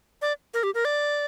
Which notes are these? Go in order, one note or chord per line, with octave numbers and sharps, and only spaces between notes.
D5
A#4
G4
A#4
D5